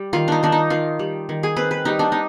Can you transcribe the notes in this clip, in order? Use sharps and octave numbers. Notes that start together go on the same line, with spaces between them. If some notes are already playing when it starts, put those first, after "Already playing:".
Already playing: G3
D#3 F4
D4 D#4
D#3 D4
D#4
D#3 F4
G3
D#3
G#4
C4 B4
B4
G3 D#4
D4
D#4